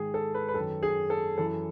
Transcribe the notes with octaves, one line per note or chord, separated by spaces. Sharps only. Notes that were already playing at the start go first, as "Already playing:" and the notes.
Already playing: G#2 D#3 G#4
A4
B4
B4
F#2 D#3 A4
G#4
A4
F#2 E3 A4